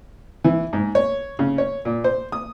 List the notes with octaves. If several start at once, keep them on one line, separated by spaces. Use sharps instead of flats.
E3
G#2
C#5
C#3
C#5
A#2
C5
D#6